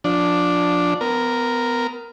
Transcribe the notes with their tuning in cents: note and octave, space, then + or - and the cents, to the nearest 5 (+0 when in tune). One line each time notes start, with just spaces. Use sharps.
F3 +20 D4 +0
B3 +30 A#4 +0